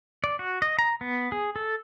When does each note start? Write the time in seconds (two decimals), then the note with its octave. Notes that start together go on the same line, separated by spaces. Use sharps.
0.24 D5
0.39 F#4
0.62 D#5
0.79 A#5
1.01 B3
1.32 G#4
1.56 A4